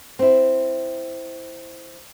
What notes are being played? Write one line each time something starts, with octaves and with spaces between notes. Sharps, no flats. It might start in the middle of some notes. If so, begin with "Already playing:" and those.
C4 E4